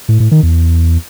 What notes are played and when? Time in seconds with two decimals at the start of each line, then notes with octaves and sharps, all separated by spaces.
0.09 A2
0.20 A2
0.31 D#3
0.43 E2